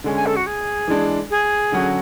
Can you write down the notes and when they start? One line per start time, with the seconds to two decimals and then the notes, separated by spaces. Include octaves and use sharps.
0.04 D3 G#3 C#4
0.15 G#5
0.26 A4
0.36 F#4
0.46 G#4
0.88 E3 G#3 D4
1.30 G#4
1.72 D3 F#3 C#4 F#4